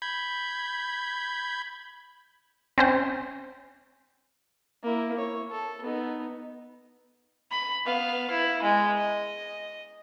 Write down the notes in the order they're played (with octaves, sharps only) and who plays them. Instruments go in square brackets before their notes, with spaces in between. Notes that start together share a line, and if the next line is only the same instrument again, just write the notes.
[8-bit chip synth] B5 G6 G#6
[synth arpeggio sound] C4 C#4 C5
[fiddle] A#3 E4
C#5
A4
B3 D#4
[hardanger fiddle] B5
B3 F5
E4
G#3
D#5